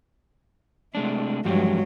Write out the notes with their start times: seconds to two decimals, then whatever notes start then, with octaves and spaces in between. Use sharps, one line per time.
0.95 C3 G#3 A3 D4
1.45 E2 G2 F3 F#3 G#3 G4